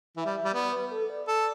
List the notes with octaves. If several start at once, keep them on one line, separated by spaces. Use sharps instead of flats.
E3 E5
G3
E5
G3
B3 D5
B4
A4
D5
A4 D5